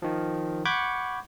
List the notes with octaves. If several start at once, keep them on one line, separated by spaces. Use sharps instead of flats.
D#3 F3
F#5 B5 C#6 D6 G6 G#6